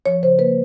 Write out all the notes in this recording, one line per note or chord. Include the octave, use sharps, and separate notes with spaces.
F3 C#5
C#3 C5
A#3 B4